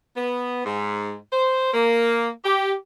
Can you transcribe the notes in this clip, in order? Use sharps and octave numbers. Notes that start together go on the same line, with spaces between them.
B3
G#2
C5
A#3
G4